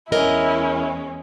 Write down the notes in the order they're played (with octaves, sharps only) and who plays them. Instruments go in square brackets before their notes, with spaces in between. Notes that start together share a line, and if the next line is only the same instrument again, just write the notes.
[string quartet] E2 G#3 C#4 [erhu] E4 [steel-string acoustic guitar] A#4 C#5 D#5